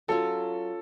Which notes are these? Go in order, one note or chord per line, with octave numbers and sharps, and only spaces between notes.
F#3 C#4 F4 A4